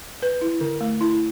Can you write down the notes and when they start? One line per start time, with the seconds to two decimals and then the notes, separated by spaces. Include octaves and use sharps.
0.22 B4
0.41 E4
0.61 D3
0.81 A3
1.01 E4